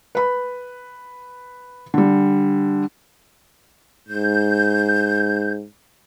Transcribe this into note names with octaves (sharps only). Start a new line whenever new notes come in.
B4 B5
D3 G3
G#2 G6